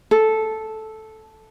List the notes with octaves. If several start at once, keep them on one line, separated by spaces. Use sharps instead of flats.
A4